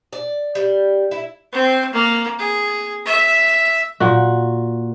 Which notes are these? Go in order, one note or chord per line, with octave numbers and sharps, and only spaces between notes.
D5
G3
E4
C4
A#3
G#4
E5
A#2 F#4